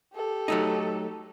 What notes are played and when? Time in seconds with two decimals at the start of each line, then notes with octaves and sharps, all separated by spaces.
0.14 G4 A4
0.48 F#3 A3 D#4